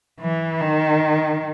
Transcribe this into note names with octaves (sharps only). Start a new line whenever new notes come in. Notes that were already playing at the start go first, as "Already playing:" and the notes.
E3
D#3